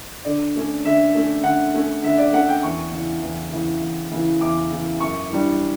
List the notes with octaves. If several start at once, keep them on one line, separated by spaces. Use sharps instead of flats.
D3 D5
A3 C#4
D3 E5
A3 C#4
D3 F#5
A3 C#4
D3 E5
D5
A3 C#4 F#5
G5
E2 C#6
C#3 E3
E2
C#3 E3
E2
C#3 E3
E2 D6
C#3 E3
F#2 C#6
E3 G3 D4